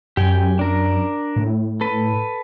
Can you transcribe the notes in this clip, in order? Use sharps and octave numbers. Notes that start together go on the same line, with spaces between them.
F#2 G4 G5 G#5
D4 A#4
A2
A4 B4